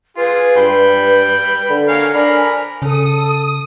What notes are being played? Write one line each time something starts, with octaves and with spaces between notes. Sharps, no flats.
F4 G#4 B4
G2 G5 B5
D3
A#4 C#5 F5 G#5
D4 A#4 B5
C#3 A4 D#6